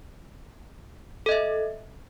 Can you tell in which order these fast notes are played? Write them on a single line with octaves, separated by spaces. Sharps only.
A4 D#5 E5